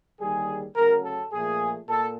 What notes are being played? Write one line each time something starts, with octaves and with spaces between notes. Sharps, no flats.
D#2 D3 G3 G#4
D2 C#3 F#3 A#4
A4
A#2 F3 A3 G#4
A#2 A4